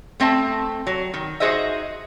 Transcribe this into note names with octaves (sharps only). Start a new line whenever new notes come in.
A3 C4 E5 A5
F#3
D#3
D#4 F#4 G#4 C5 D#5 E5